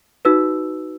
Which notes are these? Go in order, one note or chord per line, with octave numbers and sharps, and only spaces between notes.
D#4 F#4 B4 E6